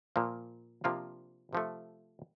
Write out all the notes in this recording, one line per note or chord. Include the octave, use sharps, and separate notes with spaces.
A#2 F3 A#3
C3 F3 A#3 D4 F4
C3 F3 A3